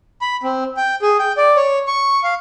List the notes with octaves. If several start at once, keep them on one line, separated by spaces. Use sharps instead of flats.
B5
C4
G5
G#4
G5
D5
C#5
C#6
F5